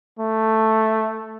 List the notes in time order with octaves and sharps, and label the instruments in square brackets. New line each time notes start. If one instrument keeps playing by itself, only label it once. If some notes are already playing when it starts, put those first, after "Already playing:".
[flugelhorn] A3